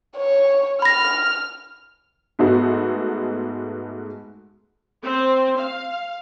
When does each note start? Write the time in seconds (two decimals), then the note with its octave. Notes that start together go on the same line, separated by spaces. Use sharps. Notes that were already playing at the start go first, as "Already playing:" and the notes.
0.17 C#5
0.82 B5 F6 A#6
2.39 G#2 G#3 A3 B3 F#4
5.03 C4
5.59 F5